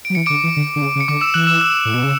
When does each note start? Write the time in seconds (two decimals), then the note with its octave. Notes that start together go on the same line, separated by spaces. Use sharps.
0.05 D7
0.10 F#3
0.15 E3 C#7
0.26 D3 D6 D7
0.44 E3
0.57 D3
0.76 D3
0.82 C#3
0.96 C#3
1.00 C#7
1.08 D3 D6 D7
1.21 E6 E7
1.34 E3 F#6 F#7
1.47 E6 E7
1.60 E6 E7
1.85 A2
1.94 B2
2.04 C#3